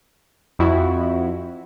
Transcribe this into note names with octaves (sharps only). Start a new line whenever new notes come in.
F2 E4 F#4